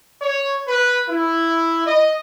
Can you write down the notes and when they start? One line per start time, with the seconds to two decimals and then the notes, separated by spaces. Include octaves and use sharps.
0.21 C#5
0.68 B4
1.09 E4
1.86 D#5